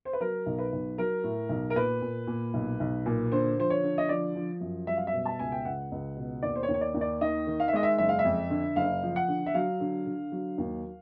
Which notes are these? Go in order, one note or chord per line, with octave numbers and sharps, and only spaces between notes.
C5
B4
F#3 A#4
B1
B4
B1
F#3 A#4
A2
B1
A#4
A#2 B4
A#2
A#2
B1
B1
A#2
D3 C5
F3 C5
C#5
D3
D#5
F3 D5
F3
F#2
G3 E5
F5
E5
B2
A5
C#2 G#5
G5
C#2 F#5
C#2
B2
D#2 D5
C5
C#5
D#2
C#5
D5
D#2
D5
D#3 D#5
D#3
F5
E5
G#3 D#5
E5
F#1 E5
F5
E5
F2
D3
F#1 F5
F3
F#5
D3
E5
F#3 F5
D3
D3
F#3
D#2